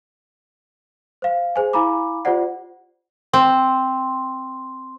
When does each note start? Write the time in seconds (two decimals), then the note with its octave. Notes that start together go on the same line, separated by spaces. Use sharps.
1.22 C5 F5
1.56 G#4 C5 G#5
1.73 E4 F5 G#5 A#5 B5 D6
2.25 F4 G4 C5 D5 F#5
3.34 C4 C6